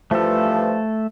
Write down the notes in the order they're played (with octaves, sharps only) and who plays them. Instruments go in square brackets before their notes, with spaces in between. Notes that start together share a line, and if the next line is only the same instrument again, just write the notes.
[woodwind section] G2 E3 F3 [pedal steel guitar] A3 A4